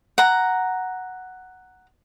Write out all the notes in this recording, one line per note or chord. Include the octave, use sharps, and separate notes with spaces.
F#5 A#5